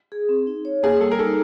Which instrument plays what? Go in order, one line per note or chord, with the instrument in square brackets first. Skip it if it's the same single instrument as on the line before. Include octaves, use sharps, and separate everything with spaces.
[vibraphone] G#4
C4
D#4
C#5
[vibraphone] A#3 [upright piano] G#4
[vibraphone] G3 [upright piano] A4
[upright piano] A#4
[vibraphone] D#4 [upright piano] A4